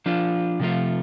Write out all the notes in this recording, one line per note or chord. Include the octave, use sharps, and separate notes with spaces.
F3 D4 F4
C3 F3 A3 F4